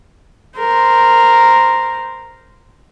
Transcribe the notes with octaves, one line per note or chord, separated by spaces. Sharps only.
A#4 C5